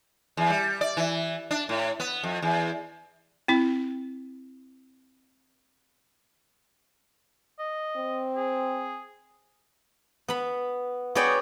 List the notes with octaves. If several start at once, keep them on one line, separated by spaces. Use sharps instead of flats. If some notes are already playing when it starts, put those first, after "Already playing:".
E2
G3
D5
E3
D4
A2
B3
F2
E2
C4 E4
D#5
C4
G#4
B3 B5
B3 F#4 G#4 C#5 D5 G5